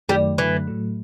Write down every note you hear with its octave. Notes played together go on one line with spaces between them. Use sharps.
F#2 D#3 F#3 G3 A3
F#2 D3 E3 F#3 A3
A2 F#3 A3